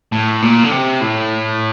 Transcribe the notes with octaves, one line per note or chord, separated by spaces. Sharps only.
A2
A#2
D3
C3
A2